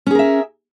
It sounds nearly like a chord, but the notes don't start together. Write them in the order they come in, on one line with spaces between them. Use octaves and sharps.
C#4 G#4 A#4 E5